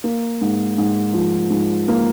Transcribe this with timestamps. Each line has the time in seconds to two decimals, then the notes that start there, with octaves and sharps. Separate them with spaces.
0.04 A#3
0.41 G#2
0.78 G#2
1.14 F3
1.50 G#2
1.88 A#3